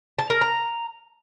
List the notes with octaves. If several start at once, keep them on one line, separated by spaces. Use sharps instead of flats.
A5
A#4
A#5